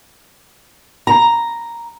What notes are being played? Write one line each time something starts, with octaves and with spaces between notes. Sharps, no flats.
A#5